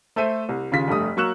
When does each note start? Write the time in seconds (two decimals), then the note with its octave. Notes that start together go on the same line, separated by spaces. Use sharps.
0.16 A3 A4 C5 E5 D#7
0.49 C2
0.71 D#2 C#3 F4 B6
0.88 F1 G2 A3 D#6
1.17 F#3 A#3 C#6 E6 F#6 E7